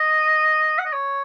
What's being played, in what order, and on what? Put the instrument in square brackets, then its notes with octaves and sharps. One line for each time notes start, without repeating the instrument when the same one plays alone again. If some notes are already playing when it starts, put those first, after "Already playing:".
Already playing: [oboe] D#5
F#5
D#5
C#5